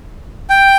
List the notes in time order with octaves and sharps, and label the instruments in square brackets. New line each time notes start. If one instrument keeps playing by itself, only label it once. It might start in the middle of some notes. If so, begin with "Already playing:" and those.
[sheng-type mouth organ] G5